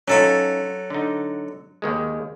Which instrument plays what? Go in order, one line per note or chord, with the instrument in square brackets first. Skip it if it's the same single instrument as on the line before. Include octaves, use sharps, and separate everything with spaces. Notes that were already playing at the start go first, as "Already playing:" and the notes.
[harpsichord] F#3 A4 B5 [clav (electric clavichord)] C#4 D#4 F4
[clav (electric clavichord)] D3 D#4
D#2 D#3 G#3